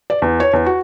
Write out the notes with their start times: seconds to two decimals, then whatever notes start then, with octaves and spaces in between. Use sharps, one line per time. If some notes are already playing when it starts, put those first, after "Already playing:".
0.10 D5
0.22 E2
0.40 C#5
0.53 E2
0.66 F#4